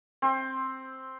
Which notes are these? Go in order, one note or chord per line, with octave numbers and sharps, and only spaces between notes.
C4 C5